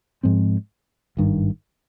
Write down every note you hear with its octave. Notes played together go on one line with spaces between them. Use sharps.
G#2 F3 G#3 C4
G#1 G2 D#3